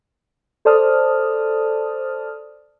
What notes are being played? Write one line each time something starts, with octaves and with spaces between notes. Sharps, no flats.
A4 C5 D5 A5 D#6 F6